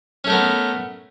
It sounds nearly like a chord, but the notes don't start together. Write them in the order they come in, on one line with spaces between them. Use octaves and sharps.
C#4 A3 A#4 B3